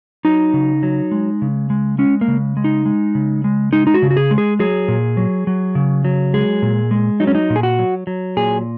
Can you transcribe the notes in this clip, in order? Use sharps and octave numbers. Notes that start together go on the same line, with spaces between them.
F#3 D#4
C#3
F#3
G#3
C#3
G#3
G#3 C#4
A#3
C#3
G#3
D#4
G#3
C#3
G#3
G#3 D#4
D#4
F#4
C#3
F#4
G#4
G#3
G#4
F#3 G#4
A#2
F#3
F#3
C#3
F#3
G#3 G#4
A#2
G#3
F#3 D#4
C#4
D#4
A#2
G#4
F#4
F#3
F#3
A#2 G#4